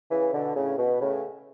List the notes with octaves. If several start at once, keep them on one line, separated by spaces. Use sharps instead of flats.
C#3 E3
B2 D3
A2 C#3
B2
A2 C#3